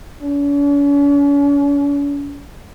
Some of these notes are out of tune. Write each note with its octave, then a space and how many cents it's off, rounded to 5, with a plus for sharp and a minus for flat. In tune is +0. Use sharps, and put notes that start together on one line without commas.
C#4 +45